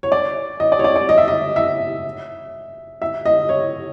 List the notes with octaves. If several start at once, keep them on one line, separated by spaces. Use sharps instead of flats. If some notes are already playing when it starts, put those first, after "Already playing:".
C#5
D5
D#5
D5
C#5
D5
D5
D#5
E5
D#5
E5
E5
D#5
C#5